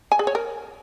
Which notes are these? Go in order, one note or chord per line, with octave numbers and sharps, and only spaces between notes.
G#5
G#4
C#5
A#4